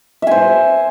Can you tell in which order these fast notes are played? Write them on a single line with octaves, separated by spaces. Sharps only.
E5 G#5 C5